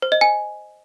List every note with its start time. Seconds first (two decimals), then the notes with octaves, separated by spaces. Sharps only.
0.02 C5
0.12 D#5
0.21 G#5